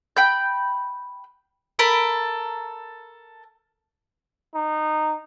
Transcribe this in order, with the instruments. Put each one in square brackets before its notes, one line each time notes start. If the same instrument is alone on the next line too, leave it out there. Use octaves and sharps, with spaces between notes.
[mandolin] G5 B5 G6
A4 A#4 B5
[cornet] D#4